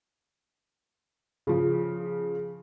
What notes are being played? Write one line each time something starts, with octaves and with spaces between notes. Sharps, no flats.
C#3 F3